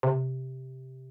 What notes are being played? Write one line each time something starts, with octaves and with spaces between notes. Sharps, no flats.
C3